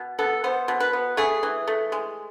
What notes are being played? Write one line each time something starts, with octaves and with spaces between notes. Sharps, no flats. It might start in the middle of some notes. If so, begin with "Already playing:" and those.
Already playing: B2
B3 A4
B3 C5
B2
B4
B3
A3 G#4
E3
A3
G#3